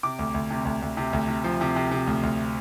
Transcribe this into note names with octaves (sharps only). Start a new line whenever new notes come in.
C3 D6
D2
D2
C3
D2
D2
C3
D2
C3
F3
C3
C3
C3
D2
D2